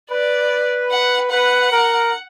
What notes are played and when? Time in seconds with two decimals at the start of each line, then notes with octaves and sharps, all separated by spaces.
0.11 B4 D5
0.91 F#5
1.31 B4 F#5
1.71 A#4